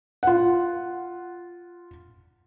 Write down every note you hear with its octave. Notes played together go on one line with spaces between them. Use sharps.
F4 F#5